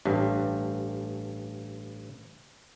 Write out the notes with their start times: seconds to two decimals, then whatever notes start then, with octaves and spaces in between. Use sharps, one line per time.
0.05 A1 G2